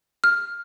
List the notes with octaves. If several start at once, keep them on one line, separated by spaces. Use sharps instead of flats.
F6